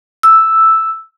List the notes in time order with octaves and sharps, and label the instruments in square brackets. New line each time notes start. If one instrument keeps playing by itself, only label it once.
[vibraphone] E6